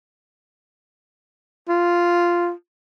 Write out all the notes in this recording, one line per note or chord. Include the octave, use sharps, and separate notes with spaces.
F4